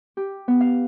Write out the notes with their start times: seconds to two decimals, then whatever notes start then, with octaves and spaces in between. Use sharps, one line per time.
0.17 G4
0.48 B3
0.61 F5